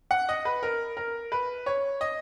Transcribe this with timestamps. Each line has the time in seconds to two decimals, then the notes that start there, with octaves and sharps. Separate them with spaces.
0.11 F#5
0.29 D#5
0.45 B4
0.63 A#4
0.97 A#4
1.32 B4
1.66 C#5
2.01 D#5